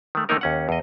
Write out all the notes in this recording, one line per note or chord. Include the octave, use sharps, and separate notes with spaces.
D#3 A3
D3 D#3 A3 A#3 D#4 A#4
D#2 C#4 F#5
E2 D#5